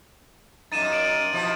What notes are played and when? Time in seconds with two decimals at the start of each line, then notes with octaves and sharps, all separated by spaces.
0.72 F#2 A#2 D#4 A6 D#7 E7
0.93 D7 F#7
1.33 B2 F3 E4